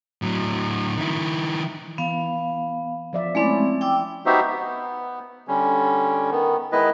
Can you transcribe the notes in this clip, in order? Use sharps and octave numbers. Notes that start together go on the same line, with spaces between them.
A2 F#3
D#3 E4
E3 B3 F5
F3 D5 E5
G#3 A3 C4 C#4 E4 D5
G5 D6 E6
B3 D#4 F#4 G4 C5 E5
B3
D3 G3 C#4
D#3 B3
D#3 G#3 B3 E4 B4 D#5